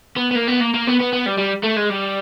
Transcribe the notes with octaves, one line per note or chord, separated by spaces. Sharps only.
B3
B3
A#3
B3
A#3
A#3
B3
B3
B3
G3
G3
A3
G#3
G3